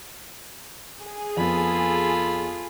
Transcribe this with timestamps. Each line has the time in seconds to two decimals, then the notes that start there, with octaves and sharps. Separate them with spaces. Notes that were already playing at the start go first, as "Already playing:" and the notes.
1.02 G#4
1.37 F2 B3 F4 A4 B5